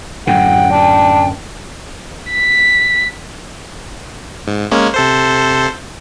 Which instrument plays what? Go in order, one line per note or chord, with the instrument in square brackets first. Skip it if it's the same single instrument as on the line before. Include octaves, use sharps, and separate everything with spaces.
[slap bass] F#2 A2 D3 [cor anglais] F#5 [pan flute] G5
[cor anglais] D4
[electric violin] B6
[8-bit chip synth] G#2
G#3 A#3 C#4
C3 A4 C5